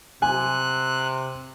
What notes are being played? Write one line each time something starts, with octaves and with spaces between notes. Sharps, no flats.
C3 G#5 F#6